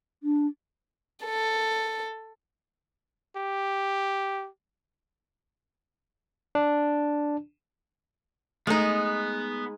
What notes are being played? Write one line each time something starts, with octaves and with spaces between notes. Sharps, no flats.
D4
A4
G4
D4
G#3 A3 B3 D#4 A4